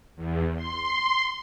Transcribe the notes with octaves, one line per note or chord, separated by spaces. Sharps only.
E2
C6